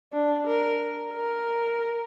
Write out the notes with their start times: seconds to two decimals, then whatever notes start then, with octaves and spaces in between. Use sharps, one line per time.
0.13 D4
0.47 A#4
1.13 A#4